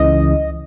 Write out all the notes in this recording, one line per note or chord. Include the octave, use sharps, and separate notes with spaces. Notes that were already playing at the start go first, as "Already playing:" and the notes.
Already playing: C#2 C#3 E3 D#5